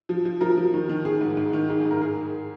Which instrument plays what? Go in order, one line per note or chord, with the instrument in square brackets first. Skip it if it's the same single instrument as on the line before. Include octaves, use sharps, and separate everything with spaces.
[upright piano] F3
F3
F3 A#4
F3
D#3
D#3
D#3 G#4
G#2
G#2
D#3
G#2 G#4
G#4
G#2
A#4
G#4